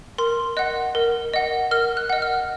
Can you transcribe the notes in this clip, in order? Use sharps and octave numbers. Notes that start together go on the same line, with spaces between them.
A#4 C6
D#5 F#5 F#6
A#4
D#5 F#5
A#4 F6
F#6
D#5 F#5
F6